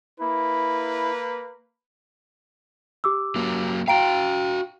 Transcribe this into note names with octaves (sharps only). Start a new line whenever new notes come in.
A#3 E4 B4
G4 D6 E6
F#3 A#3
F#4 F5 G5 A#5 D7